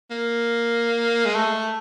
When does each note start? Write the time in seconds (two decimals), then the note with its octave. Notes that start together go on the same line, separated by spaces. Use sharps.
0.11 A#3
1.25 G#3
1.35 A3